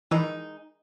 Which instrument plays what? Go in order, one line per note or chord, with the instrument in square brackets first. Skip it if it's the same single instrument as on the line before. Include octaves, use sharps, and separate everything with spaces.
[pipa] D#3 G#3 D#4 [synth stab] E3